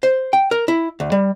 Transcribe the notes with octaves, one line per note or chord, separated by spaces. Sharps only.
C5
G5
A#4
E4
D2
G3